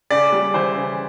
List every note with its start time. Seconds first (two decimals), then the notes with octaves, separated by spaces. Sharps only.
0.11 C#3 D5
0.32 G3
0.54 E3 C5
0.76 C#3